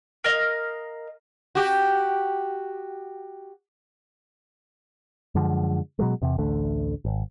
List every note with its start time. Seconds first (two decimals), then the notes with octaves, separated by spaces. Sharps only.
0.24 A#4 D#5 F5
1.55 F#4 G4
5.35 F#2 D3 F3 G#3
5.99 B2 F#3 G#3
6.22 E2 C3
6.38 A1 D2 D3 A3
7.05 G#1